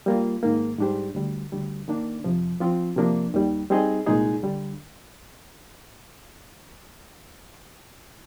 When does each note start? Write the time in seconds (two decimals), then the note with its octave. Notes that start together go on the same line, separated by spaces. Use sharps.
0.06 G3 A#3 F4
0.43 G#2 D#3 A#3
0.79 G#2 G3 D4 G4 C5
1.15 D2 D3 G3
1.52 D2 D3 G3
1.88 D#3 A#3 D4
2.24 F2 C3 F3
2.60 F3 C4 F4
2.97 C3 F3 A#3 D4
3.34 D#2 D#3 G3
3.70 G3 C4 D#4 G#4 D#5
4.06 C2 A#2 G#3 D#4 G#4
4.43 D3 G3